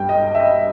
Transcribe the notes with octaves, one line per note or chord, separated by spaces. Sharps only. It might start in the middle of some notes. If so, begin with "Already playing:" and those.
Already playing: G2 G3 G5
D#5
E5
D#5